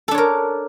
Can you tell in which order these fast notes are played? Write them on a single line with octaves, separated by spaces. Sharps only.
A4 D4 C#5 A#4